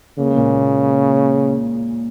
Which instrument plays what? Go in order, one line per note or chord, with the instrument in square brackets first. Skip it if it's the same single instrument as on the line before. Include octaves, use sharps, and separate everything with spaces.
[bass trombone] C#3 [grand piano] A#3
[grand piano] G#3
A#2 A#3